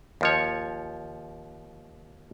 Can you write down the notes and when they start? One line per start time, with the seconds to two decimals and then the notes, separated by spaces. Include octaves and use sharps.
0.21 D#2 F3 C#5